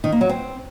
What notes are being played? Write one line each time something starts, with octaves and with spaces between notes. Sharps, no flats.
D#3
A#3
F#3
C4